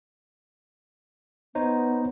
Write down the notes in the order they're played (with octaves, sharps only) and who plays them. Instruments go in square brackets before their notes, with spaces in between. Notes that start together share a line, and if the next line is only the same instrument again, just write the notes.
[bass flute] B3 [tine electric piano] D#4 C5 C#5